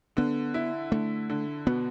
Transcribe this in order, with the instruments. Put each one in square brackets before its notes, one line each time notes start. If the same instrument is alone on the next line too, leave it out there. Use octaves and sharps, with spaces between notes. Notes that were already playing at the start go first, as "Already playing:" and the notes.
[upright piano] D3 [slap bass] B3
[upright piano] E4
[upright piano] D3 [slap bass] A3
[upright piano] D3
[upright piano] B2 [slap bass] B3